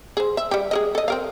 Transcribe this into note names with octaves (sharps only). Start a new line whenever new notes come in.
G#4 C5
E5
G3 G4
G#4 A#4 D#5
A4 D#5
C4 A#4 F5